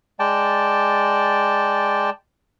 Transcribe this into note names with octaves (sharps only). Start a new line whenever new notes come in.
G#3 D5 G5 A5